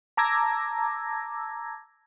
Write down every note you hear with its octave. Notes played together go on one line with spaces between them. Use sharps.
A5 A#5 D6 E6 G#6 A#6